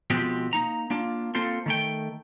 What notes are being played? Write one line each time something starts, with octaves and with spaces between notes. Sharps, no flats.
B2 F3 G#3 C4 G4
A#3 D#4 A#5
A#3 D4 F4
A#3 C4 F4 A4 C5
D#3 A3 G5